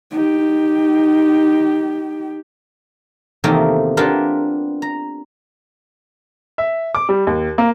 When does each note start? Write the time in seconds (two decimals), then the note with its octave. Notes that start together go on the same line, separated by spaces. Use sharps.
0.11 D#4 G4
3.44 E2 C3 D#3 A3 A#3 F4
3.97 B3 D4 F4 G4 A#4
4.82 A#5
6.58 E5
6.95 D6
7.09 G3
7.27 D#2
7.58 A#3